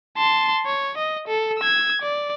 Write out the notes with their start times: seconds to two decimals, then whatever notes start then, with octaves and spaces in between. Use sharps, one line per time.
0.17 A5 C6
0.66 C#5
0.98 D#5
1.27 A4
1.59 E6 G#6
2.02 D5